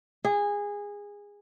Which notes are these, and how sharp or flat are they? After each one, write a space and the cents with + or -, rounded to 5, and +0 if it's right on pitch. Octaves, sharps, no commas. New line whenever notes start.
G#4 -20